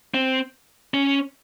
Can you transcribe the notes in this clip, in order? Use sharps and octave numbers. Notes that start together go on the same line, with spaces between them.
C4
C#4